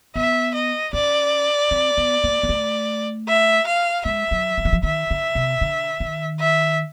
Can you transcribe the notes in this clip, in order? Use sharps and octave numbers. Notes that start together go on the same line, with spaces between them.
B3 E5
D#5
C#4 D5
C4
B3
A#3
A#3
A3
E5
F5
G#3 E5
F#3
F3
E3
F3
D#3 E5
D3
C3
D3
D#3
E5